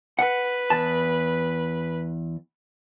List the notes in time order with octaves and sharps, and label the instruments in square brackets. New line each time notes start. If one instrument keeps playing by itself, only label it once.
[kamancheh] B4 [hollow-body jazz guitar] F#5
[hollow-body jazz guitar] E2 A5